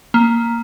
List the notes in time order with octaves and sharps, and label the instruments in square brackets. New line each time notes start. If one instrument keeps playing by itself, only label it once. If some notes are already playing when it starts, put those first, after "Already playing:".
[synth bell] A#3